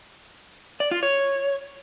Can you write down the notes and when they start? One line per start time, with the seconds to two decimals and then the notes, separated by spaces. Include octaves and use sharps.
0.80 D5
0.91 F4
1.03 C#5